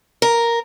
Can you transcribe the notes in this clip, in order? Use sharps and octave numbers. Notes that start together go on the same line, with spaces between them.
A#4